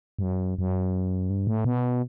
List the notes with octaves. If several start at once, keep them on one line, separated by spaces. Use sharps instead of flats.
G2
F#2
F#2
G2
A2
B2